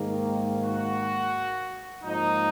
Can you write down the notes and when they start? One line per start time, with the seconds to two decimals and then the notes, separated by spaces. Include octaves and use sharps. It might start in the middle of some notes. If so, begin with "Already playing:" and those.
Already playing: G#2 D#3 A#3
0.64 F#4
2.04 G#2 F3 A#3 D#4